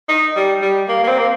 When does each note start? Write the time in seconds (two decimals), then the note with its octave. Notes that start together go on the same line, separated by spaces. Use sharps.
0.09 D#4
0.36 G3
0.62 G3
0.89 A#3
1.04 A#3
1.08 C4
1.19 A#3